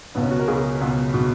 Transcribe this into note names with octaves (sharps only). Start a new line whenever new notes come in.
C#2 B2 F#3 B3
C#4
F#4
A#4
C#2 B2 F#3 G#4
C#2 B2 F#3
B2 F#3